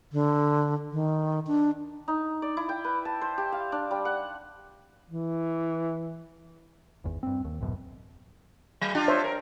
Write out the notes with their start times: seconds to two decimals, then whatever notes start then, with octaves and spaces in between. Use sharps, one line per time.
0.12 D3
0.92 D#3
1.47 D4
2.08 D#4
2.42 D5
2.57 E4
2.69 G5
2.84 B4
3.05 A5
3.21 C5
3.38 G4
3.52 F5
3.72 D4
3.91 G3
4.05 F#5
5.10 E3
7.04 G#1 E2
7.23 G2 C4
7.45 D#2
7.61 D1 A1 F#2 B2
8.81 F#3
8.95 D4 F4 G4
9.08 C5 C#5 E5
9.24 A#4